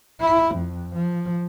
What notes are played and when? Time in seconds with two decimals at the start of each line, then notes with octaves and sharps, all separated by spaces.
0.21 E4
0.54 F2
0.94 F3